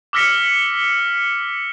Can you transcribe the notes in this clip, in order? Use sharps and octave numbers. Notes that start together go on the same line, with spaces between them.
D6 E6 F6 A#6 B6 C#7